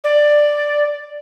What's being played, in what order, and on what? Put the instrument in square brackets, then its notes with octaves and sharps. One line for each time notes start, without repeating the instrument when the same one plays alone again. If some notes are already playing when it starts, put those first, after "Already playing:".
[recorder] D5